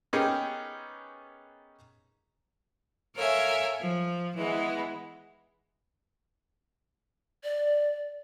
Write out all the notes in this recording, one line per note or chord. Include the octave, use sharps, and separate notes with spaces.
B3 C#4 D#4 G4 G#4 A#4
A4 A#4 C#5 E5 F5 G#5
F3
E3 G#3 B3
D5